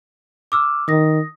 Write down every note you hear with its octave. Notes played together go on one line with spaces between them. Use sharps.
D6 E6 F6
D#3 D#6 A#6